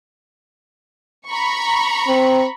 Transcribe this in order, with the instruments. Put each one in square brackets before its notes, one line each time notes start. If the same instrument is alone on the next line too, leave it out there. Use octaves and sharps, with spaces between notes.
[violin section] A#5 B5 C#6
[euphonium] C4